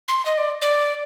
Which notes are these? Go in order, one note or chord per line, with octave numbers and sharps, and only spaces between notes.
C6
D#5
D5
D5